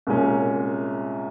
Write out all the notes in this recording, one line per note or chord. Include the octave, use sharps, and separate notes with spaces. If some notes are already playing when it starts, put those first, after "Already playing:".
C2 A#2 G#3 C#4